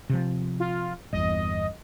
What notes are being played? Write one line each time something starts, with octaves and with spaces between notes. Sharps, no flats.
C3 F3
F4
G1 E2 D#5